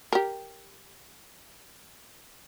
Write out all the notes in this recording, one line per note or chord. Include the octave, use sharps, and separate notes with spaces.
G4 A#4